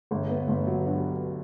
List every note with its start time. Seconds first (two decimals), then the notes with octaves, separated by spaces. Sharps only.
0.11 G1 A3
0.29 B3
0.48 G1 A3
0.67 F#3
0.86 G2 F#3